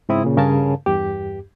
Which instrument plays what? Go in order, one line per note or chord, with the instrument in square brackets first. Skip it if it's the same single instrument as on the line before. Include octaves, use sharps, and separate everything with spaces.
[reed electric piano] G#2 C#3 C4 E4 D#6
A#2 C#3
G2 C#3 A#4 F5 G#5 A5
E2 G2 G4